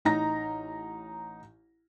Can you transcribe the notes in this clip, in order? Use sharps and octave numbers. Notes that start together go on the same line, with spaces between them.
A1 D#4 A#5 A#6